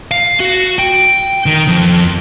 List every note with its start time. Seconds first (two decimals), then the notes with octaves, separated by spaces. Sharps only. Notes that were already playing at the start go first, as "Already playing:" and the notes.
0.11 F5
0.40 F#4
0.79 G5
1.46 D#3
1.68 F2